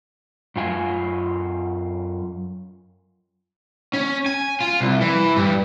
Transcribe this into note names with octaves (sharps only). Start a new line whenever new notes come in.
F#2 F4 G#5
C#4
G#5
F4
C2
E3
G2